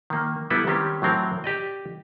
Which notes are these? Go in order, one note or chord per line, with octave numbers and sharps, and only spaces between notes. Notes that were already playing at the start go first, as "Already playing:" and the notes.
D#3 A#3
G3 B3 E4 A4 B4
D#3 G3 C4 C#4 G4
A2 F#3 C4 A#4
G4 D5 D#5